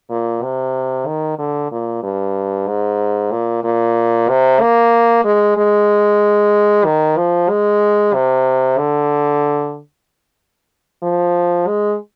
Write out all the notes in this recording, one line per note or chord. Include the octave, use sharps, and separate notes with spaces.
A#2
C3
D#3
D3
A#2
G2
G#2
A#2
A#2
C3
A#3
G#3
G#3
D#3
F3
G#3
C3
D3
F3
G#3